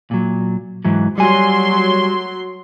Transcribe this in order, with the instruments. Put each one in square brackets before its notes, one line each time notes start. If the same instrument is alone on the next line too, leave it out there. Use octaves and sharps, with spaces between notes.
[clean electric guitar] A#2 F#3
G#2 E3 F#3
[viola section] F#3 C6 [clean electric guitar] G3 G#5